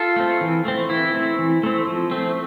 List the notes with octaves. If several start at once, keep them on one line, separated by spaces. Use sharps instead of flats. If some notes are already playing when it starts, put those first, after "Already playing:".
Already playing: F4 A4
A3 C4
E3
A3 C4
E3 E4
A3 C4
E3
A3 C4
F3
A3 C4